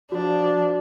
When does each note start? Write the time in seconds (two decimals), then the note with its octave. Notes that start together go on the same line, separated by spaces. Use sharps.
0.12 F3 D4 F#4